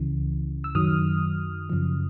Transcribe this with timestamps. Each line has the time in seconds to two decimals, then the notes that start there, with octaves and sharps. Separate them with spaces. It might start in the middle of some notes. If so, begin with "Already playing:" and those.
Already playing: C#2 C#3 E3
0.64 E6
0.75 F#2 D#3 F#3 D#6 F6
1.70 F#2 C#3 F3